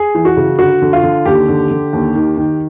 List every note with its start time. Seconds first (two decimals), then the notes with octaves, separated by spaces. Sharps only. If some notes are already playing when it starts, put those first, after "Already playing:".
Already playing: G#4
0.15 E3
0.25 F#4
0.37 C#3
0.59 D3 F#4
0.82 D3
0.93 F4
1.03 D3
1.25 D#2 G4
1.48 D3
1.71 D3
1.93 D#2
2.15 D#3
2.37 D#3